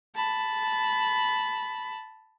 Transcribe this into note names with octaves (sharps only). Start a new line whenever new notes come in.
A5 B5